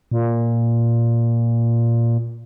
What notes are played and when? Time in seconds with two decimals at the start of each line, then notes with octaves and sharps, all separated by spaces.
0.12 A#2